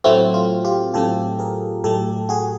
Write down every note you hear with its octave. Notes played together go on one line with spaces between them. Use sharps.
A2 F#3 A3 C4 E4 F#4
F4
F4 G4
A2 F#3 A3 C4 G4 A4
G#4 A#4
A2 F#3 A3 G4 A4
F#4 G#4